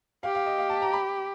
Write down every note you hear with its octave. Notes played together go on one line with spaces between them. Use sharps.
G4 F5
F5
D#5
F5
A5
A#5
B5